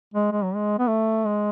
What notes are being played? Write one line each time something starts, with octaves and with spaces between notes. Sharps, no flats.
G#3
G#3
F#3
G#3
B3
A3
G#3